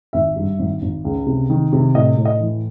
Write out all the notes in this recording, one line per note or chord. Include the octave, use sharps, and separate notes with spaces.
G#1 E5
G2
G#1
G#1
C#2
C3
D#3
C3
A2 D#5
A2
D#5
E3